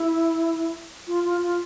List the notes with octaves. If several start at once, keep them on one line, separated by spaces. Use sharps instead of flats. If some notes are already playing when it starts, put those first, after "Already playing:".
Already playing: E4
F4
F4
F4